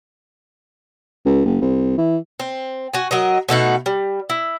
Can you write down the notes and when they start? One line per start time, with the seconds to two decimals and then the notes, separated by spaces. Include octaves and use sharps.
1.26 C#2
1.45 F#1
1.61 C2
1.98 E3
2.40 C4
2.93 F#4 G#5
3.11 F#3 A#4 D#5
3.49 B2 A3 D#4 F#5
3.86 G3
4.30 E4